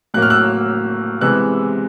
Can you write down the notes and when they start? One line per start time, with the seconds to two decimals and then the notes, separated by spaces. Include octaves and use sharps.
0.14 A2 F#3 A#3 F#6
0.22 F6
0.30 E6 F#6
1.21 C3 E3 G#3 B3 E6 F#6